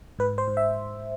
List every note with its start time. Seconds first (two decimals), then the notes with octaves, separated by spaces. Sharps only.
0.19 G#2 B4
0.38 C5
0.48 G#2
0.57 E5